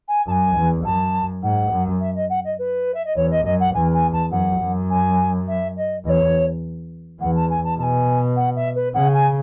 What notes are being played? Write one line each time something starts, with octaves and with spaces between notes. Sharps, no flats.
G#5
F#2 G#5 A5
E2
F#2 A5
G#2 F#5
F#2
E5
D#5
F#5
D#5
B4
E5
D#5
E2 C#5
D#5
F#2 D#5
F#5
E2 G#5
G#5
A5
F#2 F#5
F#2
G#5
E5
D#5
E2 C#5 D#5
E2 F#5
A5
G#5
A5
B2 G#5 A5
F#5
E5
B4
C#3 F#5
G#5